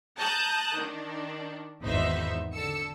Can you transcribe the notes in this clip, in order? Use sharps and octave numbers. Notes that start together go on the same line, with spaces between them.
A5 A#5 D#6 F#6 G6
D#3 D4
G#1 E2 D#4 B4 C5 E5
D3 A4 E6 C#7